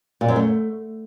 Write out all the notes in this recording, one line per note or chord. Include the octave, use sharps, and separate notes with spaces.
A#2
F#2
A3